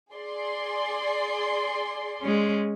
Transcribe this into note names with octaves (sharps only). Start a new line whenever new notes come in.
G#4 D5 C6
G#3 C#4